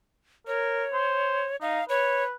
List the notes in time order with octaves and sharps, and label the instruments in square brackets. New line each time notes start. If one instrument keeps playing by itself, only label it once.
[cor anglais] A#4 [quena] C#5
[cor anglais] C5
[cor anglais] D#4 [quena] F5
[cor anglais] B4 [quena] C#5